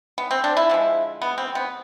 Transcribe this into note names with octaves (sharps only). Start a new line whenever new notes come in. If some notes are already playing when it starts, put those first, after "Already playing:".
B3
C4
D4
E4
D3 F3 G#3
B3
C4
B3